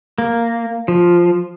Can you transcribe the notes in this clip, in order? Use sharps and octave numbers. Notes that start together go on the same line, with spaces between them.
A#3
F3